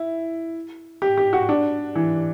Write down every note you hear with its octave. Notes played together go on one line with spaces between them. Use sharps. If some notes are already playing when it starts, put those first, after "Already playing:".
Already playing: E4
G4
G4
F#4
D4
E3